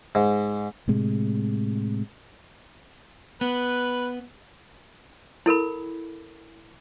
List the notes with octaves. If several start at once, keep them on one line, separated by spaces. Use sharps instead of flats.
G#2
A2 C3 G#3
B3 B4
E4 A4 A#4 B5